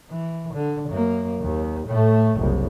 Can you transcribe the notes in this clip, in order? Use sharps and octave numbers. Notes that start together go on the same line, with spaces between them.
E3
D3
F#2 A#3
D#2
A2 A3
F#1 C2